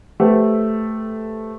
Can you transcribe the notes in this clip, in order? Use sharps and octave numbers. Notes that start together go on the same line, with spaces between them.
A3 G4 A4 B4 C5